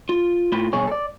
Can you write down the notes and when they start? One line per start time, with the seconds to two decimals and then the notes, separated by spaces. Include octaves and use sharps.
0.09 F4
0.52 A2 F4 B5
0.73 G2 B2 G#4 C#5
0.87 A4 D5